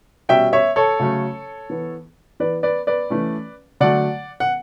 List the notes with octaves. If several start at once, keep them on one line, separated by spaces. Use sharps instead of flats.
B2 G3 C#4 E5 G5
C#5 E5
A4 C#5
C#3 F#3 A3 C#4
E3 B3
E3 B3 B4 D5
B4 D5
B4 D5
E3 A3 C#4
D3 F#3 A3 D5 F#5
F#5